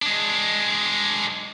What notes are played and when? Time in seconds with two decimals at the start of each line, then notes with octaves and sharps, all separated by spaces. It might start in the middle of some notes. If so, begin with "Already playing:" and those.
0.02 G#3 D4